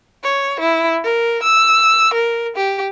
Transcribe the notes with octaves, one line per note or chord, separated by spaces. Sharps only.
C#5
E4
A#4
E6
A#4
G4